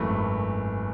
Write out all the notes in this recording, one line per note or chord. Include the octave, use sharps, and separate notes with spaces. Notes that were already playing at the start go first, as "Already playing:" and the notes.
Already playing: G#1 F#2 E3 A3 B5